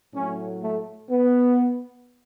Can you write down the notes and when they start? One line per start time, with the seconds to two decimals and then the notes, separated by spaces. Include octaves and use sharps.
0.14 A2 F#3 A3 C#4
0.62 A3
1.10 B3